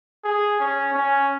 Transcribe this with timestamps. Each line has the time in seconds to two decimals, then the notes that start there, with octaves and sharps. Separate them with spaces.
0.24 G#4
0.60 C#4
0.94 C#4